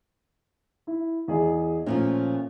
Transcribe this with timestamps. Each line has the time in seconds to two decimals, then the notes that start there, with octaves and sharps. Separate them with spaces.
0.87 E4
1.28 E2 G#4 D#5
1.86 A#2 F3 A3 C#4